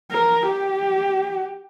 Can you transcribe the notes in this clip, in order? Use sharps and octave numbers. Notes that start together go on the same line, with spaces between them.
A#4
G4